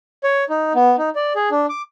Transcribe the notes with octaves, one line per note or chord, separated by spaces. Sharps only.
C#5
D#4
B3
D#4
D5
G#4
D4
D6